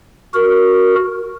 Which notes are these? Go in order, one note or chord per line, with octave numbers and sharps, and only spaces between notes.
F#4 A#4